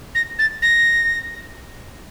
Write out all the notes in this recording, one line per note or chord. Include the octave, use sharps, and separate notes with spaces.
A#6
A6
A#6